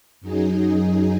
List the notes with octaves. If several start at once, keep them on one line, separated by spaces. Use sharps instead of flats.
F#2 F#3 D#4 G#4